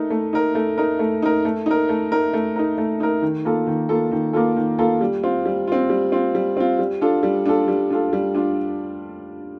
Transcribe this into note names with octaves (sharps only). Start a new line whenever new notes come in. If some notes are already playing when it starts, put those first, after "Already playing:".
Already playing: A3 D#4 A#4
A3
D#4 A#4
A3
D#4 A#4
A3
D#4 A#4
A3
D#4 A#4
A3
D#4 A#4
A3
D#4 A#4
A3
D#4 A#4
D#3
A#3 F4 A4
D#3
A#3 F4 A4
D#3
A#3 F4 A4
D#3
A#3 F4 A4
G3
C4 F4
G3
C4 F4
G3
C4 F4
G3
C4 F4
G3
D4 F4 A4
G3
D4 F4 A4
G3
D4 F4 A4
G3
D4 F4